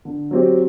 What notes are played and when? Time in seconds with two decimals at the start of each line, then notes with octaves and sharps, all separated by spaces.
0.05 D3
0.31 F#3 C4 G4